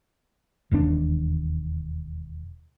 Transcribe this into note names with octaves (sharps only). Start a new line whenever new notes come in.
E1 D#2 C#3 D4